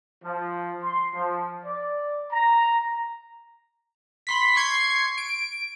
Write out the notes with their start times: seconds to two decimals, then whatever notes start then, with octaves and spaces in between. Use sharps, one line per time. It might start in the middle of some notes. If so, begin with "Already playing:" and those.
0.24 F3
0.83 C6
1.14 F3
1.65 D5
2.32 A#5
4.27 B5 C6 B6
4.55 C6 C#6 G#6 C7
5.18 D7